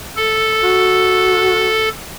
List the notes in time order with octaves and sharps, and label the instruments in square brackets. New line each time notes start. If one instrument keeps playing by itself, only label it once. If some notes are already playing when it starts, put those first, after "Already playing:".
[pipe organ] A4
[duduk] F#4